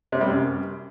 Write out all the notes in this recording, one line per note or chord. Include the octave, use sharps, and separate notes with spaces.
C3
G3
F#2